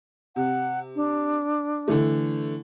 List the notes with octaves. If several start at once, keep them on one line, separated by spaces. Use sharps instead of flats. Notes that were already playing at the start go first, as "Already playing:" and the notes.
C3 F#5
D4
D3 E3 A3